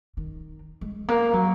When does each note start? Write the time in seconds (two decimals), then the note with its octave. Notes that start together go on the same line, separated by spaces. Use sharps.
0.17 D#3
0.81 G#3
1.08 A#3
1.33 F#3